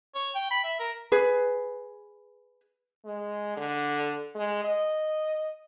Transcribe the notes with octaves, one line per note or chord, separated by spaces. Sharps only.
C#5
G5
B5
E5
A#4
G#4 B4
G#3
D3
G#3
D#5